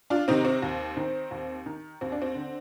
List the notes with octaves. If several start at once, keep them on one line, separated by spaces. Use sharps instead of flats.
D4 F4
C3 D#3 C4 D#4
C4
D#2
D#3
D#2
D#3
D#2 C4
D4
C4
D3